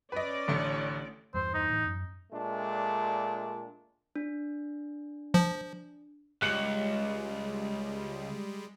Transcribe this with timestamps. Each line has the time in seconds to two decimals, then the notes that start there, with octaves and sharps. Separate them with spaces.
0.12 C#4 B4 D5 D#5
0.48 A1 D3 A3
1.34 E2 G2 C5
1.54 D#4
1.70 A2 E3
1.86 F#2
2.32 A#2 G#3 A3 D4
4.16 D4
5.34 F3
6.42 C#2 G3 G#3 F#6 C#7 F#7